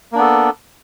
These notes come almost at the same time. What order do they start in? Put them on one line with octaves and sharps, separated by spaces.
A#3 D4 B3 A4